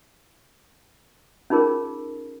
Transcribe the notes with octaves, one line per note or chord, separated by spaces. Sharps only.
C#4 D#4 F4 G#4 A#4